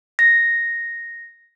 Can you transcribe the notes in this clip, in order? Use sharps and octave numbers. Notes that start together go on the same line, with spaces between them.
A#6